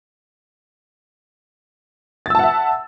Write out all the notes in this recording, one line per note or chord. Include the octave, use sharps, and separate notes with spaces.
E5 F#5 A5 E6 A6